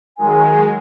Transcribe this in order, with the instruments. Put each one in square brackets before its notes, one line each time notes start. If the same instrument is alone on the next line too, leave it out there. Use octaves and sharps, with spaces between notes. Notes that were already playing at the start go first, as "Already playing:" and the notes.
[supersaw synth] D#3 F#3 G#3 [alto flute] G#5